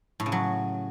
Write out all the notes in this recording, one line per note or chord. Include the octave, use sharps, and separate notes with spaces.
A2
C#3
F#3